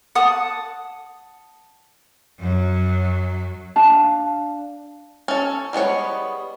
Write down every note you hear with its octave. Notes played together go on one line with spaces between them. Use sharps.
F#5 A5 D#6
F#2 F#3
D4 F5 A5
C#4 A4
G3 G#3 B3 C#5